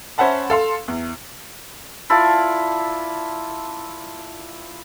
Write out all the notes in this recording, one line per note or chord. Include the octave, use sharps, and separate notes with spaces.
C#4 C5 E5 F#5 A5 B5
A4 F5 C6
E2
E4 F4 A4 D5